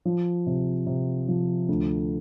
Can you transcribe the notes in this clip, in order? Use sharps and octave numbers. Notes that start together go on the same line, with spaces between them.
F3
C3
C3
F3
D2